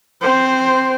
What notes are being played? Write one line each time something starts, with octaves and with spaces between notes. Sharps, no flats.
C4 C5